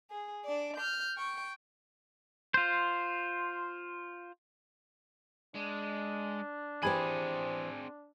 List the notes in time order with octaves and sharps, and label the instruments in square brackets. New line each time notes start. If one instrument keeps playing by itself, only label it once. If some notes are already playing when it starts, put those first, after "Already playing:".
[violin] G#4
D4 D5
F6 G6
G5 C#6
[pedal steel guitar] F4 C5
[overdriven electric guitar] G#3 [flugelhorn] D4
[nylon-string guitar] E3 G4 C5 [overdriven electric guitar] C4 G#4 [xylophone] G#5 B5 G#6